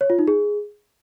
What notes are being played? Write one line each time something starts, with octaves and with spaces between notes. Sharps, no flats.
C#5
F4
D#4
G#4